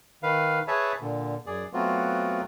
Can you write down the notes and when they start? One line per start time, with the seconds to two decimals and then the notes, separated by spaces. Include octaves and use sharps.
0.23 D#3 B4 F5
0.68 G#4 B4 C#5 E5 A5
1.01 A#2 D3
1.46 F#2 G#4 D5
1.73 F#3 A3 B3 C4 F4 F#4